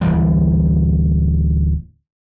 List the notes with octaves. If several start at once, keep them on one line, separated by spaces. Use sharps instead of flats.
D1 D#2 E3 G3